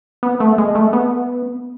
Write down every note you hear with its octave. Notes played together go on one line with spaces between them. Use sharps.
B3
A3
G#3
A3
B3